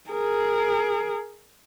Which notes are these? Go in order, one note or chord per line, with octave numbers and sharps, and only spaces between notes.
G#4 A#4